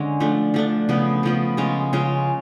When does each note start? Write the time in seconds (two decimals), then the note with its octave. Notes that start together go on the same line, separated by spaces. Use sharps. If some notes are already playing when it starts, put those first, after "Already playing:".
Already playing: D3 G#3 C#4
0.20 F3 A3 D4
0.54 F3 A3 D4
0.89 C#3 F3 B3
1.23 C#3 F3 B3
1.57 C#3 G#3 C#4 F4
1.93 C#3 G#3 C#4 F4